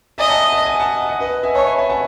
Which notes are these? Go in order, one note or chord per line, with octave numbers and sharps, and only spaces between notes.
D#5 E5 G#5
F#5 A5
A5
G#5
F#5 A5
D#5 F#5
B4 D#5
E5 G#5
C#5 A5 C#6
G#5 B5
E5 G#5
F#5 A5